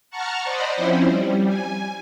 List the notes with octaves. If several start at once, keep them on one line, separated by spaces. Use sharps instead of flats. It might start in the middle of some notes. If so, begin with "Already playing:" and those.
F#5 A5 A#5 C#6 F6
C5 D5 D#5 F#5 B5
F3 C4 C#4 E4 C5
G3
G#5